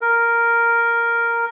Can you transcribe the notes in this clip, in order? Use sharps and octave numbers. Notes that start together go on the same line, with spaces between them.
A#4